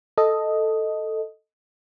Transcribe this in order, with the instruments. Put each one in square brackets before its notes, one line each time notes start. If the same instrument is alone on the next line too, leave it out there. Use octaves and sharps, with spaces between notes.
[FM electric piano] A4 D#5